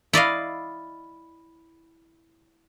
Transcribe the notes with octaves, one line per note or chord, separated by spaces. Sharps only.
E4 D5 D#5 F5